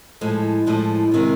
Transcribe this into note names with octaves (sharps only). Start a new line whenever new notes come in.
A2 F3 G#3
A2 F3 G#3
C3 D#3 G#3